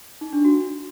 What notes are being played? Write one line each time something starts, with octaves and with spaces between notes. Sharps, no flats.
D#4
D4
F#4